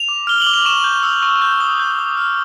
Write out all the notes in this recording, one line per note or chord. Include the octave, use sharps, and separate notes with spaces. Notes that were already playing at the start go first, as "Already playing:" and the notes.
Already playing: F7
D6
F6 G7
D6 F#7
F7
C#6 E7
G6
E6
C#6
G6
D#6
G6
D#6
F6